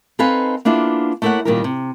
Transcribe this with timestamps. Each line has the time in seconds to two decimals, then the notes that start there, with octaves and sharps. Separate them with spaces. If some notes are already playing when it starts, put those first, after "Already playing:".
0.19 C4 D#4 A4 B4 F5 G#5
0.65 A#3 B3 D4 E4 F4 G#4
1.22 A3 A#3 E4 A4 C#5 F#5
1.45 A#2 D#3 G3 C#4 G4 A#4
1.64 C3